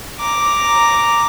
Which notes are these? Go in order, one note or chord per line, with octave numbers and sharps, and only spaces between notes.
A#5 D6